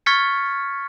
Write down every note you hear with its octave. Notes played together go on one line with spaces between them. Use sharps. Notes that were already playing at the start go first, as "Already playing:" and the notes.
C#6 F6 G#6 A6 B6 C#7